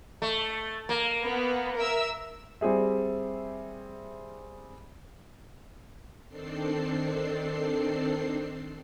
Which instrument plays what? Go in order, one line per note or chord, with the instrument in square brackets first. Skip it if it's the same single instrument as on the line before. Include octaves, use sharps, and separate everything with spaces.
[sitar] A3
A#3
[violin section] B3
A#4 E5 E6
[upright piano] G3 C4 G4 G#4 E5
[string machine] D#3 C4 D4 A4 C7